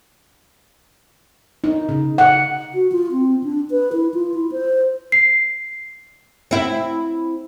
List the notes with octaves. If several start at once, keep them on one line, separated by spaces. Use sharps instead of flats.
D#4
C#3
F#5
F#4
F4
C4
D4
B4
E4
F4
E4
C5
C7
C4 E4